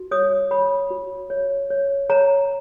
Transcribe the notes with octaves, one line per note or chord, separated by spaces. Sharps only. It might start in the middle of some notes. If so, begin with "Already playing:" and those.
Already playing: F#4
C#5 D#6
C#5 B5
F#4
C#5
C#5
C#5 A#5